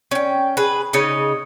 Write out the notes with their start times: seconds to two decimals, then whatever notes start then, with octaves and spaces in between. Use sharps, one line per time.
0.11 C#4 G5
0.57 G#4 B4
0.93 C#3 D#4 C#5 D#5